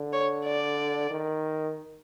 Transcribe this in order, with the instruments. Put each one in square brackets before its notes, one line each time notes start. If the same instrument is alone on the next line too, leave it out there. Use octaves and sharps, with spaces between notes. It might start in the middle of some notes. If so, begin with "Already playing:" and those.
Already playing: [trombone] D3
[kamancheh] C#5
D5
[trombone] D#3